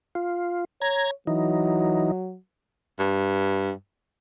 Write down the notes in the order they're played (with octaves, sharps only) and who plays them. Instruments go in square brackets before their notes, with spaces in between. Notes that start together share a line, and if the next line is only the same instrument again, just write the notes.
[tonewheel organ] F4
[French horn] C#5 [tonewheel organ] A#5 G#6
[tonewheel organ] E3 D#4 [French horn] F#3
[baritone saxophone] G2